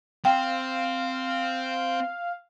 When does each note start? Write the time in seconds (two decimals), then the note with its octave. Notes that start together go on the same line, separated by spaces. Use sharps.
0.25 C4 F5 G5